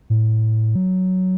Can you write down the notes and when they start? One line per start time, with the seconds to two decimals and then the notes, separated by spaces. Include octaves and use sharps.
0.10 A2
0.75 F#3